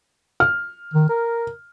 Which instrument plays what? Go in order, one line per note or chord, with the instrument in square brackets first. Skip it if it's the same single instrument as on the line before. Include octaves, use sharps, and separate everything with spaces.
[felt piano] F6
[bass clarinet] D#3
A#4